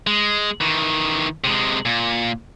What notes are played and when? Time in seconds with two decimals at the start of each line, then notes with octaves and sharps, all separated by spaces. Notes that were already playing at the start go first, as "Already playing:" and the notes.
0.07 G#3
0.61 D#3 E3
1.44 C3 G#3
1.85 A#2